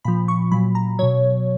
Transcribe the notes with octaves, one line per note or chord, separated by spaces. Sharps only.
A#2 F3 B5
C#6
A#2 F#3 B5
A#5
B2 F#3 C#5